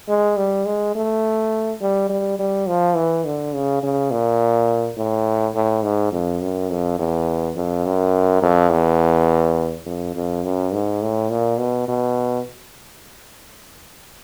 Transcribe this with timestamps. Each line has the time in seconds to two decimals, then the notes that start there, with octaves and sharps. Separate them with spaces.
0.08 G#3
0.37 G3
0.66 G#3
0.95 A3
1.81 G3
2.10 G3
2.39 G3
2.68 F3
2.96 E3
3.25 D3
3.54 C#3
3.83 C#3
4.11 A#2
4.97 A2
5.55 A2
5.83 G#2
6.12 F2
6.42 F#2
6.70 F2
6.99 E2
7.56 F2
7.86 F#2
8.42 F2
8.71 E2
9.86 F2
10.15 F2
10.44 F#2
10.73 G#2
11.02 A2
11.30 A#2
11.59 B2
11.88 B2